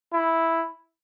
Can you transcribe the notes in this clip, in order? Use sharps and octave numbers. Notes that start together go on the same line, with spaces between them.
E4